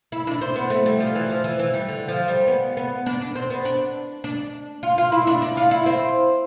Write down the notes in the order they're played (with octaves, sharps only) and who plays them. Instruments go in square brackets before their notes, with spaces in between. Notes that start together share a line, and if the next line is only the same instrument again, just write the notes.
[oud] E4
D4
C4
B3
A3
G3
F3
E3
F3
E3
E3
G3
D3
F3
G3
B3
B3
D4
D4
C4
B3
D4
D4
F4
F4
E4
D4
D4
F4
E4
C4